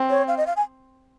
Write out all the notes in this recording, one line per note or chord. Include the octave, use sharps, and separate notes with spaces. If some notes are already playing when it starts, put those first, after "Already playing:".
Already playing: C4
C#5
F5
D#5
F5
G#5